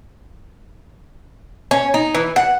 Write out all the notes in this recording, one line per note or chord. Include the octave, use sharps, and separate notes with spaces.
C#4
D#4
E3
F#5